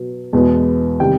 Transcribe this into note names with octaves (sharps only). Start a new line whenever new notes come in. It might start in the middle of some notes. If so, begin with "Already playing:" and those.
Already playing: B2 F#3 B3
E2 B2 G#3 B3
C3 D#3 G3 G5